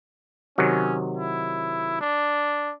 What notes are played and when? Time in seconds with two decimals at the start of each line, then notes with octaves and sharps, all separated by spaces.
0.58 C3 D#3 F#3 C#4
1.17 E4
2.01 D4